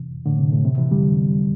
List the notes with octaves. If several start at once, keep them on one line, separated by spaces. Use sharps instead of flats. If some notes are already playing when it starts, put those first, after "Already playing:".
Already playing: C3 E3
A2 D3
C3
A2
C3
C3 E3
D3 G3